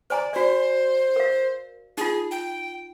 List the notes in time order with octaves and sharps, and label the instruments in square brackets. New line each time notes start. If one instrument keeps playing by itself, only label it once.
[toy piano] C5 G#5 A#5 [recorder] D5
[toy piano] F#4 D5 [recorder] C5
[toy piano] A#4 F5
[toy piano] D#4 F4 [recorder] G#4
[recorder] G5